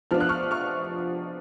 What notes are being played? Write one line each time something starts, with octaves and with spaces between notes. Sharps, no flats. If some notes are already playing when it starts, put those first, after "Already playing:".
F3 B3 D4 F4 F6
F#6
C#6 F6
C#6 F6